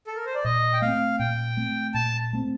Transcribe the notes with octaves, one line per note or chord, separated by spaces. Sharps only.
A4
A#4
C5
D5
A#2 D#5
G5
A3 C4 F5
A#2 G5
A3 C4
A#2 A5
A3 C4